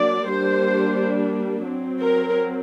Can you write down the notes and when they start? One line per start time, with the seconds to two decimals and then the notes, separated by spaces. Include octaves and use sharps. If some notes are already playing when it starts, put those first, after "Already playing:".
Already playing: F#3 A#3 D4 D5
0.28 G3 A#3 D4 C5
1.65 F#3 C4
1.99 A#4